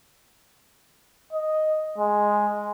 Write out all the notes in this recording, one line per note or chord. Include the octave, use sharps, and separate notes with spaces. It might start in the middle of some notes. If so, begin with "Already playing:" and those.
D#5
G#3